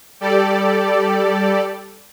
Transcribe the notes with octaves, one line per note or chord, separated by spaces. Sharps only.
G3 G4 A4 D5